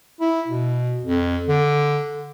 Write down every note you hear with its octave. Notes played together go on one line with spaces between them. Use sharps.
E4
B2
F2
D3